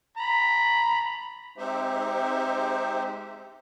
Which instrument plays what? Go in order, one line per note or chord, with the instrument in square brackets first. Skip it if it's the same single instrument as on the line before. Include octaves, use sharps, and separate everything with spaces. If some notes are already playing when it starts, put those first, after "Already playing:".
[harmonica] A#5 B5
[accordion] G#3 C4 D#4 G4 C5 E5